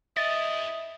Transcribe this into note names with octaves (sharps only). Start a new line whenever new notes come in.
E4 G#4 D#5 E5 A6